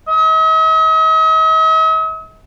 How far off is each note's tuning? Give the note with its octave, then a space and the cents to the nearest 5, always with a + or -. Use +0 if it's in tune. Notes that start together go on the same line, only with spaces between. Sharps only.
D#5 +45